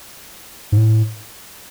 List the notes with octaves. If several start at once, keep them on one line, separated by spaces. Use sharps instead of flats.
G#2
A2